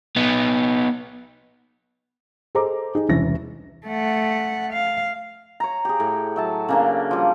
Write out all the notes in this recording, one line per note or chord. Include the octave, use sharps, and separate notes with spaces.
B3 D#4
G#4 A4 C5 D#5 A#5 D6
D#4 G4 G#4
E1 C2 E3 C#4 A#6
A3 F#5
F5
C#5 A#5
G4 G#4
A2
F#3 E5 A5
C#3 A#3 D4
F3 G3